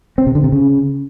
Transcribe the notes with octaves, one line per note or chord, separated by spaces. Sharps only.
C4
C3
D3
C3
C#3